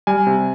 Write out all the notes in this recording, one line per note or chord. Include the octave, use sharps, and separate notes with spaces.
G3 G#5
C3